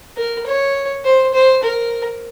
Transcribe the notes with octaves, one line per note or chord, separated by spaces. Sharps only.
A#4
C#5
C5
C5
A#4